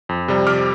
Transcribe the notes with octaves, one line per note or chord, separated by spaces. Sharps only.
F2
C3 G3
F2 D6 F6